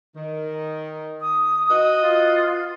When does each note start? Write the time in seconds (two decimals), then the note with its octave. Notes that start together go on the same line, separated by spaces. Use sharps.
0.16 D#3
1.21 D#6
1.70 F#4 B4 D#5
2.02 F4